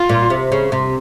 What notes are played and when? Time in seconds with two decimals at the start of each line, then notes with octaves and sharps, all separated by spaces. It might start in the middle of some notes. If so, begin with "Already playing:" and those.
Already playing: F4
0.09 A#2
0.30 C3
0.52 C#3
0.72 C3